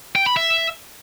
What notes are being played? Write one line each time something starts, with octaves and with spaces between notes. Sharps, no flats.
G5
B5
E5